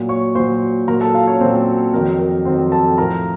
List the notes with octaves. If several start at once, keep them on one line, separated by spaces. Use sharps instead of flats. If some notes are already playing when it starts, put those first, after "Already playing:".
Already playing: A#2 F#3
C#5 C#6
A#2 F#3 C5 C6
A#2 F#3 A#4 A#5
A4 A5
F4 F5
C#4 C#5
A#2 F#3 C4 C5
F2 D#3 F#3 A#4
A#4
F2 D#3 F#3 C4 C5
A4 A5
A2 F3 A#4 A#5